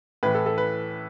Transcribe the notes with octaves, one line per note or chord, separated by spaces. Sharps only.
A2 E3 B4
A4
A4
B4